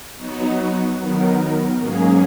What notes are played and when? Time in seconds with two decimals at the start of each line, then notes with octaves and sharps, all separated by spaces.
0.17 F#3 B3 D#4 F#4
0.97 D#3 F#3 B3 D#4 A#4
1.78 G#2 F#3 A#3 C#4 G#4